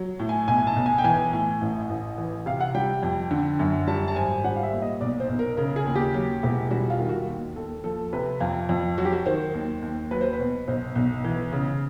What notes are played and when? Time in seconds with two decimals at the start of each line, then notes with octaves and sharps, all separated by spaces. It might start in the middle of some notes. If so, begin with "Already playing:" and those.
Already playing: F#3
0.19 A2
0.29 G#5
0.48 B1 G#5
0.67 A5
0.76 B1
0.86 G#5
0.98 G5
1.04 E3 G#5
1.33 A2 G#5
1.61 A1
1.89 A1
2.18 E3
2.46 C3 F5
2.60 F#5
2.75 G3 G5
3.03 F2
3.31 D3
3.59 F#2
3.87 G3 A5
4.08 A5
4.16 G#1 G#5
4.44 G3 F#5
4.56 F5
4.63 E5
4.73 A#2
4.82 D#5
5.01 B1 D5
5.20 C5
5.29 B1
5.39 A#4
5.57 C#3 A#4
5.76 G#4
5.86 D#2
5.95 G4
6.14 F#3
6.43 E1
6.71 G3 F#4
6.90 F4
6.99 D#3
7.09 F#4
7.27 D#2
7.56 D#2 A4
7.84 F3 A4
8.13 C3 B4
8.40 F2 F4
8.69 F2
8.98 F#3 F#4
9.05 G4
9.12 F#4
9.26 D#3 C5
9.54 D#2
9.82 D#2
10.11 F#3 B4
10.21 C5
10.33 B4
10.39 B2
10.68 B1 C5
10.95 B1
11.24 E3
11.52 C#3